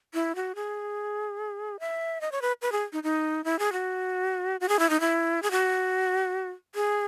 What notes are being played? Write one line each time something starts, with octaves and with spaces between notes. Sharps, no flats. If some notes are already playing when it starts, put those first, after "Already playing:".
E4
F#4
G#4
E5
D#5
C#5
B4
B4
G#4
D#4
D#4
E4
G#4
F#4
F#4
G#4
E4
D#4
E4
G#4
F#4
G#4